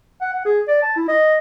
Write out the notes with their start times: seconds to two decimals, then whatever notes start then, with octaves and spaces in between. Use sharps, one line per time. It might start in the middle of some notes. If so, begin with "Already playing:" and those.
0.21 F#5
0.34 F#5
0.45 G#4
0.68 D5
0.83 A5
0.96 E4
1.08 D#5